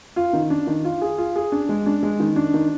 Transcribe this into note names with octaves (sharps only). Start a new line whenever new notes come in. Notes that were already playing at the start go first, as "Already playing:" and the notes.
F4
D#3
D4
D#3
F4
G#4
F4
G#4
D4
G#3
D4
G#3
D#3
D4
D#3